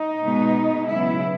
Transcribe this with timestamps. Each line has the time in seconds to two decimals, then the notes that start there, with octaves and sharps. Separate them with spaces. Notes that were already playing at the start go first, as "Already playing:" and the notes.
Already playing: D#4
0.21 B2 G#3 B3
0.87 C#3 F#3 B3 E4